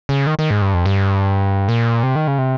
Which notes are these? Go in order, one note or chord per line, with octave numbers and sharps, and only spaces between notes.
C#3
D#3
D#3
G#2
G2
F2
G2
A#2
C3
D#3
C#3
C3